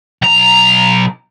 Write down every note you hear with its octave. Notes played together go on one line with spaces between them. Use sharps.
B1 A#5